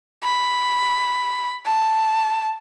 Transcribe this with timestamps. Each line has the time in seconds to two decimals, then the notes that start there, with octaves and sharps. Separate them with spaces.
0.23 B5
1.66 A5